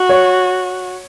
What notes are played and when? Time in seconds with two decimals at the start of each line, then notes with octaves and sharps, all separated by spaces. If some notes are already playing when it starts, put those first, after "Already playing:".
Already playing: F#4
0.09 C#5